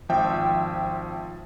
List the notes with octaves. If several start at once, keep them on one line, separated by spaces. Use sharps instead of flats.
G#1 F3 E5 G5